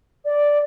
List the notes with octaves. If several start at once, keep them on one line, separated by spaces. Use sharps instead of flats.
D5